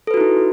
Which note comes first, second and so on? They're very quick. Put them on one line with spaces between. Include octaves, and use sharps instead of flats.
A4 B4 F#4 E4 D#4